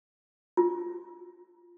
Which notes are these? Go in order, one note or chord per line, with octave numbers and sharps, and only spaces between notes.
F4